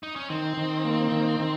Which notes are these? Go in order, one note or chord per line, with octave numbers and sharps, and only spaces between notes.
D#4
C#4
D#3 C4
D#3
A#3
D#3
D#3